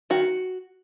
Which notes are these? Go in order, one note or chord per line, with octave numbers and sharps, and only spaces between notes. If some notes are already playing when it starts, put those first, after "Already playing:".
D#3 F#4